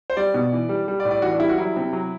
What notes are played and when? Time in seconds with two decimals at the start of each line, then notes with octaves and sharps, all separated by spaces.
0.10 C5
0.17 G3 D5
0.34 B2
0.52 E3
0.69 G3
0.88 G3
1.00 D5
1.05 A2
1.11 D5
1.22 E3 F#4
1.31 D4
1.40 G3 E4
1.49 F#4
1.58 F#3 E4
1.76 C3
1.93 F#3